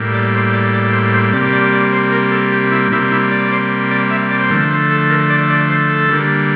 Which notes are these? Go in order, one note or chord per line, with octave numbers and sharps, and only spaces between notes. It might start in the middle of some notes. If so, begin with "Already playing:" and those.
Already playing: A2 G3 A#3
D5
C5
D5
D5
C5
C5
C3 G3 A#3 D5
D5
D5
C5
A#4
A4
G4
E4
C3 G3 A#3 E4
E4
D5
D5
C5
D5
E5
D5
C5
D3 F3 A3 A#4
C5
A4
A#4
D5
D5
C5
A4
D3 G3 A#3